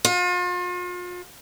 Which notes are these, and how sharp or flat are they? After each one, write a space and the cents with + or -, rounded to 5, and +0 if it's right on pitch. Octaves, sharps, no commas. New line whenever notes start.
F4 +40